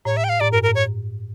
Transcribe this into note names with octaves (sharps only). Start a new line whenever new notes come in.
A2 C#5
E5
G5
F5
A2 D5
G2 A#4
A#4
A2
C#5